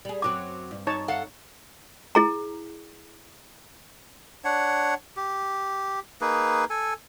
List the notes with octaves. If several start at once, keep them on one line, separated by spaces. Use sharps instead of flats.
G3 G#4
F#2 F#3 C4 D6
G2
D#4 C#5 A5
A4 F5 F#5
E4 G#4 A#5
D4 C#5 F#5
G4
A#3 D#4 G#4 B4
A4 G#5